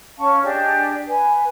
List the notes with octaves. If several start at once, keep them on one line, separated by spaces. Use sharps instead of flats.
C#4 F5 A5 C#6
D4 G4 G#4 D#5
B4 G#5